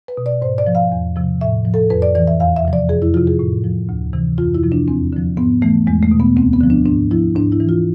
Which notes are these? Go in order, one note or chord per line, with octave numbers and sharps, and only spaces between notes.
B4
B2
D5
G#2 C5
D5
F3
F5
E2
C3 F3
A2 E5
F3
A4
F2 B4
D5
E3 D5
E5
E2 F5
E5
C3 F3
D5
F2 G#4
E4
C3 F3 F4
G#4
A2
F3
D2
C3 E3
F2 F4
E4
C3 F3
D4
E2 C4
D3 F3
G#2 B3
E3 A3
E2 G#3
A3
B2
B3
D2 C4
B3
D3 F3
D4
G#2 D4
F3 E4
G#2 D4
E4
E3
F4